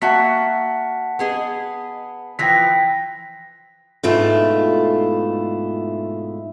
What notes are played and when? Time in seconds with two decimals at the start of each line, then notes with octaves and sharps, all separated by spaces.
0.02 A#3 F#4 E5 F#5 A5 B6
1.19 B3 G#4 D#5
2.39 E3 F3 G5 A#6 B6
4.03 G#2 B2 A3 E4 F4